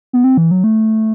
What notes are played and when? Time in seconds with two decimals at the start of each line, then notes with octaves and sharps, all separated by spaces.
0.13 B3
0.24 C4
0.37 E3
0.51 F#3
0.64 A3